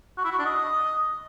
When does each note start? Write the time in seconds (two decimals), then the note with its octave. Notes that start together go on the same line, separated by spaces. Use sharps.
0.18 F#4
0.25 E4
0.32 F#4
0.39 D4
0.46 D#5